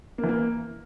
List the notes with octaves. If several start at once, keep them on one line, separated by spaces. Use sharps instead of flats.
A#3
E3
A#3